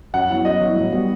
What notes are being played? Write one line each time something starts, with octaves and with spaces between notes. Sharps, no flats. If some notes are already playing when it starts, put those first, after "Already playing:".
F#2 F#5
F#3 B3 E4
F#2 D#5
F#3 B3 E4
A2
G3 B3 F#4